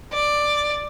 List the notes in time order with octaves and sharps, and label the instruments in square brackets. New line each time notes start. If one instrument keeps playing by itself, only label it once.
[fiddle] D5